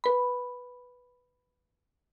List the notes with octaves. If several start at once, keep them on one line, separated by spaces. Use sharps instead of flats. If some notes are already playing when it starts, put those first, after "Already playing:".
B4 B5